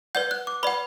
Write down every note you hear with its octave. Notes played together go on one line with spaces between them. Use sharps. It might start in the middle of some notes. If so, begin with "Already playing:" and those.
B4 D5 F#5 G6
F#6
D6
B4 D5 F#5 B5